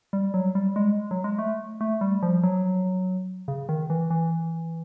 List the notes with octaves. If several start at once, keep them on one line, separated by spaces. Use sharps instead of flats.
G3
F#3
G3
G#3
F#3
G#3
A3
A3
G3
F3
F#3
C#3
D#3
E3
E3